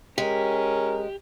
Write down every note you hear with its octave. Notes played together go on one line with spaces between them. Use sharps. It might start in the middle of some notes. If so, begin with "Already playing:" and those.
G#3 C#4 G4 A#4